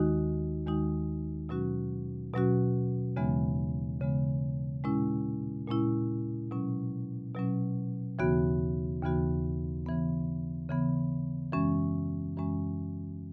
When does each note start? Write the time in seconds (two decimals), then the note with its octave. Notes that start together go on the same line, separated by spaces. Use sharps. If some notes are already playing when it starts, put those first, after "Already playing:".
Already playing: D#2 D#3 G#3 D#4 F#4
0.66 D#2 D#3 G#3 D#4 F#4
1.49 B2 F#3 C#4 F#4
2.33 B2 F#3 C#4 F#4
3.16 D#2 C#3 E3 G#3 B3
4.00 D#2 C#3 E3 G#3 B3
4.84 A#2 G#3 C#4 E4
5.68 A#2 G#3 C#4 E4
6.51 B2 F#3 C#4
7.34 B2 F#3 C#4
8.19 D#2 C#3 E3 B3 F#4
9.02 D#2 C#3 E3 B3 F#4
9.86 C#3 E3 B3
10.70 C#3 E3 B3
11.53 F#2 E3 G#3 C#4
12.37 F#2 E3 G#3 C#4